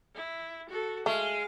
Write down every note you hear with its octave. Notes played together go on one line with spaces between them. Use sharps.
E4
F#4 A4
G#3 A3 F5